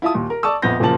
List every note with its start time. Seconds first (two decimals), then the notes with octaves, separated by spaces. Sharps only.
0.02 E4 F4 E5 A5 D#6
0.15 D#2 A#2
0.30 A#4
0.43 D5 A5 C#6 D#6 E6
0.62 A#1 F2 B3 G6 A#6
0.80 F#1 A#2 C#3 F3 A5 F#7